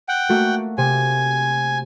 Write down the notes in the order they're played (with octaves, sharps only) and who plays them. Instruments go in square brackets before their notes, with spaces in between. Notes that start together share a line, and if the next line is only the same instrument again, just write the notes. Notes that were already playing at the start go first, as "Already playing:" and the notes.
[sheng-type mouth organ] F#5 G5
[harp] A3 A#3 F#4
[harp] C3 [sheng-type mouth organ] G#5